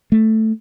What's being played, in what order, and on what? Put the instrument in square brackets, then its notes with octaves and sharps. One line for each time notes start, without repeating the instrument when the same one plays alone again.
[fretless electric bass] A3